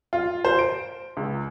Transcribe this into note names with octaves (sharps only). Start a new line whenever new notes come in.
F4
C5
D7
C#2